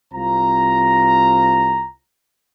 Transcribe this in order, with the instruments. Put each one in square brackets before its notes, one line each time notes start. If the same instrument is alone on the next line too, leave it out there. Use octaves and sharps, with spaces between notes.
[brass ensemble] C2 C4 F4 A#5